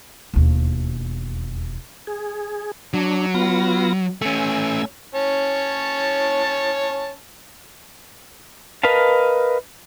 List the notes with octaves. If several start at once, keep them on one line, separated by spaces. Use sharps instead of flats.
E1 D#2
G#4
F#3 D4
B3 F4 A#6
A3 C#4 G#5 E6
C#4 C#5 A5
A#4 B4 D#5 F5 A5